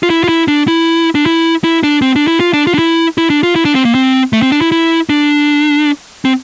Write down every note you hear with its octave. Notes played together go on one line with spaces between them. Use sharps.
F4
E4
F4
E4
D4
E4
D4
E4
E4
D4
C4
D4
E4
F4
D4
F4
D4
E4
E4
D4
F4
E4
D4
C4
A#3
C4
A3
C4
D4
E4
E4
D4
C4